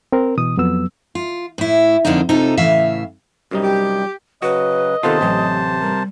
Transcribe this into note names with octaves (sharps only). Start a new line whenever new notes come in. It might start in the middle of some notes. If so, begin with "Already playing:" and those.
C4 A#4
B2 E3 D#6
F2 F#3 B3 E6
F4
A2 E4
F2 D3 A#3 D4 D#4
C3 D#4 F4 A4
A2 C#3 E3 E5 F5
F#2 C3 G3 D#4
G4
C#3 F#3 F#4 B4 D#5
C3 D#3 B3 F4 A4 C5 A5
A1 F#3
G3 A#4